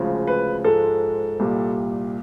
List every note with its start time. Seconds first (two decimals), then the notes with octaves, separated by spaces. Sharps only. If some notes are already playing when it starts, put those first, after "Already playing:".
Already playing: D2 C#3 F3 G#3
0.27 B4
0.64 G#2 F3 G#3 A4
1.40 C2 A#2 G3